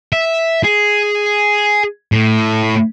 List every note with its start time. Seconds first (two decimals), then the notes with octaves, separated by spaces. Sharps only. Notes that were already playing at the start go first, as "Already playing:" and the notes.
0.13 E5
0.64 G#4
2.12 A2